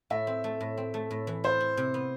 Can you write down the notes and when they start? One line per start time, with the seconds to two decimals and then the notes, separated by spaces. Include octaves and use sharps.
0.10 A2 E5
0.27 C4
0.44 A3
0.61 A2
0.77 C4
0.94 A3
1.11 A2
1.27 E3
1.44 E4 C5
1.60 E4
1.77 C3
1.94 B3